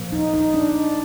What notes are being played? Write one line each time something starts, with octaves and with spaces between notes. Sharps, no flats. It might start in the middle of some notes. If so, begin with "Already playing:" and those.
Already playing: A#2 F3 A#3
D#4
D#4
D4